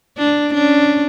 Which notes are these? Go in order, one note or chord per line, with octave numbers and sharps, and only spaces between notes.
D4
C#4 D4